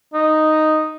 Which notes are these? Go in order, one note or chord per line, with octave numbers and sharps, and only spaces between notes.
D#4